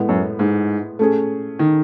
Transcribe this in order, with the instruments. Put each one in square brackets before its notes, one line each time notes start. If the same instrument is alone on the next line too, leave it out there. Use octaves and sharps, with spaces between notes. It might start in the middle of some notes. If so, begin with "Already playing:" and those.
Already playing: [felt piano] A2 G#3 B3 E4
[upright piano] F#2
G#2
[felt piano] A3 C#4 G#4
[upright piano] D#3